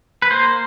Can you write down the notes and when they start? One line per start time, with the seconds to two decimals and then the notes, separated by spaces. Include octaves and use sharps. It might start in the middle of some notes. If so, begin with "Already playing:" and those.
0.22 B4
0.31 A#3 C5